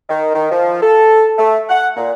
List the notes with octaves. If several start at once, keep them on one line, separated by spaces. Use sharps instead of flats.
D#3
D#3
F3
A4
A3
F#5
A#2